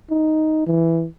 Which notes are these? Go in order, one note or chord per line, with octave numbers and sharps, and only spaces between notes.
D#4
E3